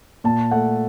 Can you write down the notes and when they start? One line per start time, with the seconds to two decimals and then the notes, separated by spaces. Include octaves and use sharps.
0.24 A#2 A5
0.51 A3 F#5